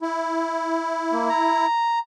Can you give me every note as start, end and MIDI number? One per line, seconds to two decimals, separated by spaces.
0.01 1.66 64
1.12 1.28 58
1.29 1.99 82